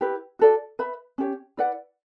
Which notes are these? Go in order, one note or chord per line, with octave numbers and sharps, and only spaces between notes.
E4 G4 B4
F#4 A4 D5
B4 E5 B5
C#4 G4 C#5
E4 B4 D5 F#5